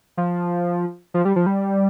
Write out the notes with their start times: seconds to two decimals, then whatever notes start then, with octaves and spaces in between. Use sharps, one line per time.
0.17 F3
1.14 F3
1.25 G3
1.36 F3
1.46 G3